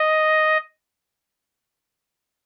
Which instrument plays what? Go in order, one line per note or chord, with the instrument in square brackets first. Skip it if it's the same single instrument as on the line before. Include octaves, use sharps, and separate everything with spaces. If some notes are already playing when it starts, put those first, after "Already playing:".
Already playing: [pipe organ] D#5